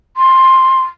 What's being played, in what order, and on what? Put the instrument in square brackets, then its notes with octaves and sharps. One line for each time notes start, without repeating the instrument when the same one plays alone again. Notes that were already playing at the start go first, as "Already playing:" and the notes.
[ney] C6